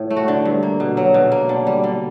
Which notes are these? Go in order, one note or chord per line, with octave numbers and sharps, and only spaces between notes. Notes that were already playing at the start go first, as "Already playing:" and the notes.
Already playing: A2
A3
F#4
D3
G2
A#3
B2
F#3
B2
A#3
D3
G3
D3